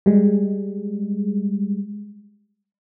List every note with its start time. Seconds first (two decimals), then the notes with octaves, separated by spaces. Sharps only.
0.06 G3 G#3